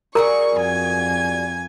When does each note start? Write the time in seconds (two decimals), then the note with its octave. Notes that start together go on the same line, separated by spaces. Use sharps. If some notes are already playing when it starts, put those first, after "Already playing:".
0.15 G3 F#4 G#4 A#4 A#5 C#6
0.56 F2 G#5 G#6